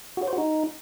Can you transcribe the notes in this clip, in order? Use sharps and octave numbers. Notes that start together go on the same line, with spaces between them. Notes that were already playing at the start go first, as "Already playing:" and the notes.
F#4
C#5
C5
F#4
D#4